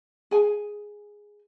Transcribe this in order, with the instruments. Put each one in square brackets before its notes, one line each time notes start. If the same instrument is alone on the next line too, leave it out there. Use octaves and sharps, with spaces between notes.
[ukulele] G#4 G#5